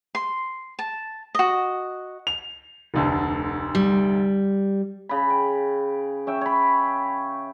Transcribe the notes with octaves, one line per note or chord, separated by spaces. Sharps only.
C6
A5
F#4 D#5
F7
F1 D2 D3
G3
C#3 B5
G5
C#4 E5 G5
C#5 B5